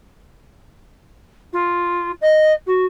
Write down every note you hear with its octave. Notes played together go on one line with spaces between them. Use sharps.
F4
D#5
F#4